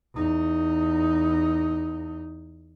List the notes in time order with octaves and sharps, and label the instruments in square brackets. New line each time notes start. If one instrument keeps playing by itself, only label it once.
[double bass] E2 D#4